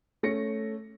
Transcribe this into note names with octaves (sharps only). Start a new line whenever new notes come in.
A3 C#4 A#6 C#7